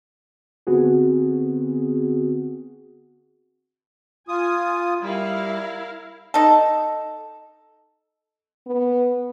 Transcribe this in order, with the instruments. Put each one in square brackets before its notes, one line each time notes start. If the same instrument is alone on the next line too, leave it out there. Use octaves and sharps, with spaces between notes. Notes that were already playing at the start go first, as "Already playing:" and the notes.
[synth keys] D3 B3 C4 F#4 G#4
[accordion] F4 D#6 [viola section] G#5
[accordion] G3 [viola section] E4 A#4 F5
[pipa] D#4 A4
[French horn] B3